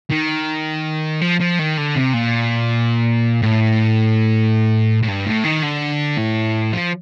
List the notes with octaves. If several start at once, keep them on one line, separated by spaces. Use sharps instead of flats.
D#3
F3
F3
D#3
D3
C3
A#2
A2
A2
G2
A2
D#3
D3
A2
F3